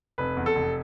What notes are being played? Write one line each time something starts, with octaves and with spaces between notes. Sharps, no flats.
F1 B4
E2
A4
F1